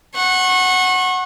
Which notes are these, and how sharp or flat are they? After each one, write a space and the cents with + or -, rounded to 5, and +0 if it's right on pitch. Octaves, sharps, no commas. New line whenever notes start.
F#5 +0 C#6 -35